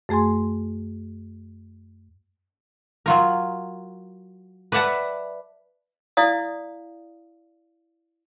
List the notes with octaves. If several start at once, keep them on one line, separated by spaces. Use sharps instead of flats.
F#2 A3 G#4 G#5 C6
F#3 F4 A#4
B4 D5 E5 F#5 A5
E4 D5 F5 D#6